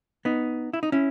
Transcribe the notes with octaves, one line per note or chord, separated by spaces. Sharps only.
B3 D#4
E4
D#4
C#4 E4